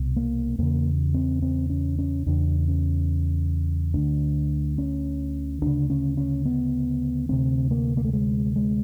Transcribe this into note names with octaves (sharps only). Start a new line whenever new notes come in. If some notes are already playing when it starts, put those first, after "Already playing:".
Already playing: C2 B2
A#3
E2 C#3 A#3
C4
C4
C#4
C#4
E2 C#3 D4
C#4
D2 D3 D4
C#4
D2 C#3 D4
C#4
C#4
B3
D2 C3 C4
A#3
A#3
A3
G#3
G#3